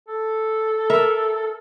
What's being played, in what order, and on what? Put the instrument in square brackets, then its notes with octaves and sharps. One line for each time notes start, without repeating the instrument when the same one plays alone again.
[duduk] A4
[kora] A#4 E5